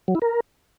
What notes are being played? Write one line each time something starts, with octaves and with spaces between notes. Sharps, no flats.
F#3
E4
A#4